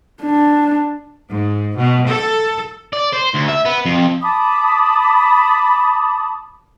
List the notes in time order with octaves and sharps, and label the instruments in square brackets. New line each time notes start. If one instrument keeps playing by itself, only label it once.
[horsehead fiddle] D4
[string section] G#2
B2
A4
[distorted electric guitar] D5
C5
D2
E5
B3
F2
[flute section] A5 B5 D6 D#6